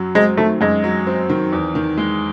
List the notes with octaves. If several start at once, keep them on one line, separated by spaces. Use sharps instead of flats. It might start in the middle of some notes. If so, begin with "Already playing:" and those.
Already playing: F#2 F#3
G#3 C4
D#3 A3
F#2 G#3
F#3
C4
D#3
E2
D#3
G#3